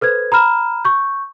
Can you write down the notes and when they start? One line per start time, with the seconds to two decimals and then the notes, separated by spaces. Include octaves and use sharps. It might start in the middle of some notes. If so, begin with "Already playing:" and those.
0.01 A4 B4 C5 G#6
0.32 A#5 B5 F6 E7
0.85 C#6 G6